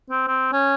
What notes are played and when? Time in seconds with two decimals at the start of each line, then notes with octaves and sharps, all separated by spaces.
0.10 C4
0.27 C4
0.52 C#4